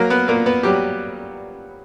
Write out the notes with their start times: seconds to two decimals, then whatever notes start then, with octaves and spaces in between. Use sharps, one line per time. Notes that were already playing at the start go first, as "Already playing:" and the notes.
Already playing: F#3 A#3 A#4
0.10 B3 B4
0.28 A#2 A#3 A#4
0.46 B3 B4
0.63 F#3 G3 G4